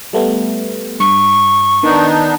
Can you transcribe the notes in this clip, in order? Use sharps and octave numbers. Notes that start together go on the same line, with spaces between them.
G3 A3 B3
G2 C#6
D#3 B3 D4 D#4